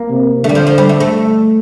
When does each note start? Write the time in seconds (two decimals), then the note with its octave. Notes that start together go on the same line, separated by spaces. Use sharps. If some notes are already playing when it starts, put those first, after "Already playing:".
Already playing: A#3
0.10 C3
0.43 D3 A3
0.49 G3
0.55 F3
0.67 F3
0.78 G3
0.89 A3
1.00 A3